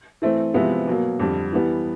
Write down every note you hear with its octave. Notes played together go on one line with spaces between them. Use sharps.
E3 A3 C4
C3 F3 G#3 B3 E4
B2 F#3 A#3
F2 D3 G3
E3 G3 B3